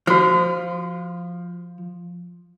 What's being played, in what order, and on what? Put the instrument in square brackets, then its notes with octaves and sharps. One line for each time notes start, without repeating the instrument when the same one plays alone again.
[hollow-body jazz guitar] F3 [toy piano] F#4 C5